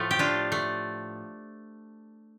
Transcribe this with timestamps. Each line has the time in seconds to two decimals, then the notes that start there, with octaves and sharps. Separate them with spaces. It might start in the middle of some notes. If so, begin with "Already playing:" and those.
Already playing: A2 F3 A3
0.11 G4
0.19 D4 F4
0.52 A3